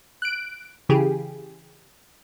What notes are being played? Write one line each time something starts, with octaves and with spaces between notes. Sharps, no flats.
F#6 D7
C#3 E3 G4 G#4